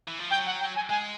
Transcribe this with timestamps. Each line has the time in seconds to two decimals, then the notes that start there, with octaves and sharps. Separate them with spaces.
0.08 E3
0.19 F3
0.30 F#3 G5
0.46 F#5
0.60 G5
0.75 G#5
0.89 G#3 G#5